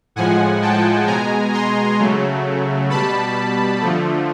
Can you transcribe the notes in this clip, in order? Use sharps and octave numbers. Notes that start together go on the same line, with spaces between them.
A2 F3 G#3 F#5 G#5
G5 A5
B2 G#3 G#5 A#5
A#5 C6
C#3 F#3 A3
B2 G3 A5 B5
D3 F3 A3